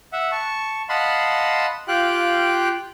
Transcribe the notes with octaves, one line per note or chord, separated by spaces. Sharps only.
E5 F#5
A5 C#6
D#5 F5 F#5 A5 B5 C6
F4 G4 F5 G5 F#6